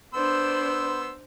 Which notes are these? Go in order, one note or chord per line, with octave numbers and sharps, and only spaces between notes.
B3 D4 C5 C6 E6